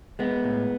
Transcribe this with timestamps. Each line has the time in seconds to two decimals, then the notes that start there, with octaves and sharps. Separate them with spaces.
0.19 G#3 B3
0.44 A2